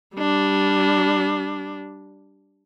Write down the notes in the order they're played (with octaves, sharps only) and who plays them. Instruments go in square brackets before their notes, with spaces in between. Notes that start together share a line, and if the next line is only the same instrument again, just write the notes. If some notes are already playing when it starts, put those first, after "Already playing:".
[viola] G3 D4